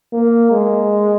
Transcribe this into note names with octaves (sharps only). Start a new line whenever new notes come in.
A#3
G#3